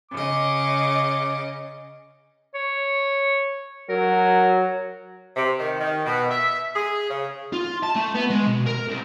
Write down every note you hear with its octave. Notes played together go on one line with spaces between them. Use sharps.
C#3 D#5 D6
C#5
F#3 A#4
C3
D#3
D#3
B2
E5
G#4
C#3
F4
A5
A3
B3
G#3
B2
A#4
C2